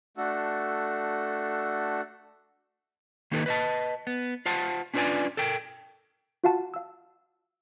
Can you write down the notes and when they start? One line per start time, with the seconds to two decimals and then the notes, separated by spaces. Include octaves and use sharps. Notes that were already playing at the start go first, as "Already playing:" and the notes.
0.17 A3 D4 F#4 A4
3.31 D#3 A#3 D#4 G4 A4 B4
3.46 B4 D#5 A5
4.07 B3
4.46 F4 C5 F#5 A5
4.94 C#4 D4 F4 B4 D5 G#5
5.37 A4 A#4 G5
6.44 F4 F#4 F5 F#5 A5
6.74 F5 E6